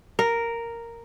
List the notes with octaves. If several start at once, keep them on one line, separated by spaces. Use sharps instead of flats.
A#4